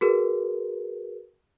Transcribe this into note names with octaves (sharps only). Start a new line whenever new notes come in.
F#4 G#4 A#4 B4